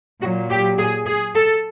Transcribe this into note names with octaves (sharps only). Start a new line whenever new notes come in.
A#2 F#3 F#4
G4
G#4
G#4
A4